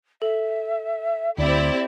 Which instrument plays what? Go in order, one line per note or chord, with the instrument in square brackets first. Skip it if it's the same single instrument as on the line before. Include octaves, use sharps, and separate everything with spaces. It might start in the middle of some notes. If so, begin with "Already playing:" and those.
[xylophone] A4 [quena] E5
[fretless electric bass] D2 [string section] C4 E4 G4 [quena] D5